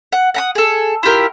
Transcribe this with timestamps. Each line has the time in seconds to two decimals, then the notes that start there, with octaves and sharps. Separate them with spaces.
0.12 F#5
0.34 F#5 A#5 D#6
0.55 G#4 A4
1.03 E4 F4 G4 A#4